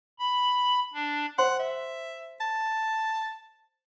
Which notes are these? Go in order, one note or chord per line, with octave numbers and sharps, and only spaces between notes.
B5
D4
C5 F#5 G5 C6
E5
A5